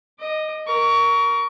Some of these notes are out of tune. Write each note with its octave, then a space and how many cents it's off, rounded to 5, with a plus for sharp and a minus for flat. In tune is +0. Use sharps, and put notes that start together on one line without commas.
D#5 +0 D6 +40
A#4 +5 C#6 +25